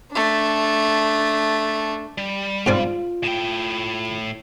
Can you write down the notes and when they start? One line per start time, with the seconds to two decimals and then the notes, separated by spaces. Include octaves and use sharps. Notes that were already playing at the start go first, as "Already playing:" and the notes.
0.12 A3 D4
2.18 G3
2.66 G#2 C4 D4 F4
3.24 A2 G5